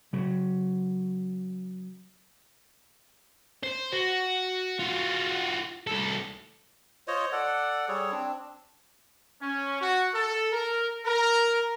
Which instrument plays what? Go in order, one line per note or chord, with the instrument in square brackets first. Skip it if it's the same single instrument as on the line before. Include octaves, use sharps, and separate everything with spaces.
[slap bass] C#3 F#3
[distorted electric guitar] C5
F#4
F4 F#4
C2 A4
[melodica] F4 C5 C#5 D#5
A4 D5 F#5
G3 G#4 A4 C#5
C4 D4
[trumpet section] C#4
F#4
A4
A#4
A#4